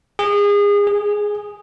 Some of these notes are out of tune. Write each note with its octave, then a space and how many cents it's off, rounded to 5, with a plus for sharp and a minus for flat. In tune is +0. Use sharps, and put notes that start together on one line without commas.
G#4 -30
G#4 +0